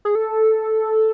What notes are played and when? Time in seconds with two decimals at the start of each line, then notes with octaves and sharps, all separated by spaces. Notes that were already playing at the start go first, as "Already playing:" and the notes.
0.05 G#4
0.15 A4